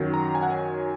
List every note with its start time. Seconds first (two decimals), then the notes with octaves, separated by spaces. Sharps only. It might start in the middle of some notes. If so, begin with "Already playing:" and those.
Already playing: F#2 D#3 F#3
0.14 A#5
0.35 G#5
0.43 F#5
0.50 G#5